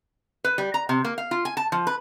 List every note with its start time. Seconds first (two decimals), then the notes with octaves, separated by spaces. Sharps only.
0.44 B4
0.58 G3
0.74 A#5
0.89 C3
1.05 A#3
1.18 F5
1.31 F4
1.45 G#5
1.57 A5
1.72 F3
1.87 B4